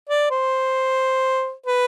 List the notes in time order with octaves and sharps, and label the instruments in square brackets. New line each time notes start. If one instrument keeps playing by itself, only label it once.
[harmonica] D5
C5
B4